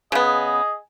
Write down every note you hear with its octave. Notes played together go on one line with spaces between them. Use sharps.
C#3 B3 G#4 D#5